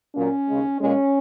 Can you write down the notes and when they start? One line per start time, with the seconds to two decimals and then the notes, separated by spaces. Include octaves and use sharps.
0.15 A#2 F#3 A#3 C#4
0.48 D#2 C#3 G#3
0.81 A#2 G#3 C#4